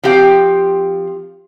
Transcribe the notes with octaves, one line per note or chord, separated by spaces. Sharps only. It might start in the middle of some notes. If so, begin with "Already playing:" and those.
F3 C4 G4 F5